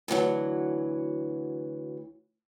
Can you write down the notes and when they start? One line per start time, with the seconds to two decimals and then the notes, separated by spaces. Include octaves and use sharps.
0.08 D2 D3 E3 F#3